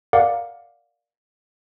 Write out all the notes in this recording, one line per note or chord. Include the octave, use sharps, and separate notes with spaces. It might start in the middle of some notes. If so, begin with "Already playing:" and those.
A#4 D5 F5 F#5 D6